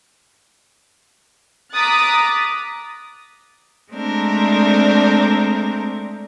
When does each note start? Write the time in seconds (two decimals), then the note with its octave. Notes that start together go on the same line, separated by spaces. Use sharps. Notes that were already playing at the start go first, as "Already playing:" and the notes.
1.74 A#5 D6 D#6 F#6 A6 B6
3.91 G#3 A3 C4 D4 A#4